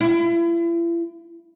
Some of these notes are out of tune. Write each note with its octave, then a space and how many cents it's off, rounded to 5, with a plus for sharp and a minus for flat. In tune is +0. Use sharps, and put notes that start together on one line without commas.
E4 +40